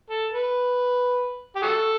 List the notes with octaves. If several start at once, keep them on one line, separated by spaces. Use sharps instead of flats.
A4
B4
G4
F#4 A4